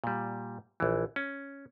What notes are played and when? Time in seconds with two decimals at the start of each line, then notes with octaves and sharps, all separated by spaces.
0.04 A#2 G3
0.80 A#1 E3
1.16 C#4